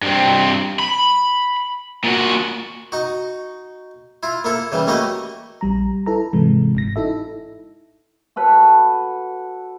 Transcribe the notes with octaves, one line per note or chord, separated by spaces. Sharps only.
G2 C4
B5
A#2 F#4
D#4 F#4
E4 F4
A#3 E4 A4
C#3 E3 G3
A3 A#3 F#4 G4 D#5
A#1 G3 A#5
E4 A4 B4 A#5
G#2 C3 E3 G#3
G1 G#2 A#6
D#4 E4 A4 E5
F#4 A4 B4 C#5